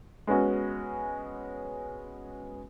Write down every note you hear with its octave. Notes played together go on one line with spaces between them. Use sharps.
G#3 B3 C#4 F#4